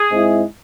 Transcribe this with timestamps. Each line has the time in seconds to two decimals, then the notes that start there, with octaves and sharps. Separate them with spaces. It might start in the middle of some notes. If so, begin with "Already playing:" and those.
Already playing: G#4
0.10 G#2 G#3 C4 E4